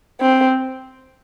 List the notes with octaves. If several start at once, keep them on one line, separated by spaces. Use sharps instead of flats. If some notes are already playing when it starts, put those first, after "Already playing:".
C4